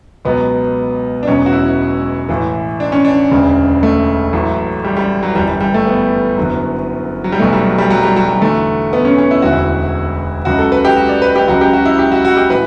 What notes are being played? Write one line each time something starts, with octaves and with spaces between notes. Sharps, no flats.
C#2 B2 F#3 B3
D4
E1 E2 B2 F#3 C#4
F#4
E4
A1 A2 E3
D4
C#4
D4
E1 D2 C#3
A3
A1 A2 F#3
G3
G3
F#3
G1 F#2 E3 G3
G3
G3
A3
B3
F#1 F#2 D3 F#3
F#3
G3
B1 B2 F#3 A3
G3
F#3
G3
F#3
G3
F#3
F#3
E2 D3 F#3 A3
B3
C#4
C#4
E4
E1 D2 D3 F#4
E4
C#2 C#3 F#3 F#4
A4
B4
G4
F#4
D5
B4
G4
C#2 C#3 F#3 F#4
G4
F#4
E4
G4
F#4
F#4
G4
A2 E3 B4